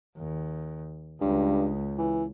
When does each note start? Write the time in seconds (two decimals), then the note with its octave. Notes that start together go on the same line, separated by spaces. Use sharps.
0.17 D#2
1.21 C#2 G2
1.98 E3